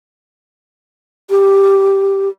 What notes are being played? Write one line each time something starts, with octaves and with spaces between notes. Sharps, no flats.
G4